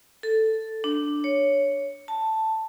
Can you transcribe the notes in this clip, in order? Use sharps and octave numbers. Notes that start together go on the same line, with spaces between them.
A4
D4
C#5
A5